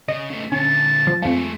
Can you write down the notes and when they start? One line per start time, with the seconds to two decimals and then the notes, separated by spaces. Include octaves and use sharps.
0.08 C#3 D#5
0.30 C#3 A3
0.52 A#2 D3 C#4 A5
1.07 F3
1.22 F2 F3 G#3 A3